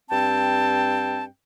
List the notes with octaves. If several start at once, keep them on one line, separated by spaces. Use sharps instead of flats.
G2 C4 G5 A5